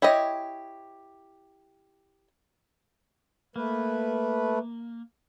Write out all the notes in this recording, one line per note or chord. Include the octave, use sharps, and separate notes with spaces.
E4 G4 C#5 D#5
A3 A#3 B4